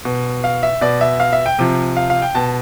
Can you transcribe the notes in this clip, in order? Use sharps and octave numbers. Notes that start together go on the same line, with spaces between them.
B2
F5
E5
B2 D5
E5
F5
E5
G5
C3 F3
F5
F5
G5
B2 A5